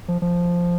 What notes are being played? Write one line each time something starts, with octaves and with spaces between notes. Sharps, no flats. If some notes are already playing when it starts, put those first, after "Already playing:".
F3
F3